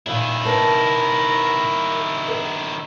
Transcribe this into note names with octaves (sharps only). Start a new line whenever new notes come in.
A#2 D#3 E4
B2 A#4 A5
A#4